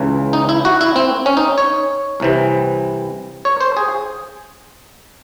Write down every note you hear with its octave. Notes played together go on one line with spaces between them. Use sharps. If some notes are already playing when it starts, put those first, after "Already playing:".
Already playing: C#2 C#3 E3
D#4
E4
F#4
E4
C4
C#4
D#4
C#5
C2 C3 E3
C#5
C5
G#4